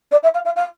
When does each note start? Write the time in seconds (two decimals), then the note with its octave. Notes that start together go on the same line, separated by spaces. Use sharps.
0.11 D5
0.23 E5
0.34 F5
0.45 F5
0.56 F5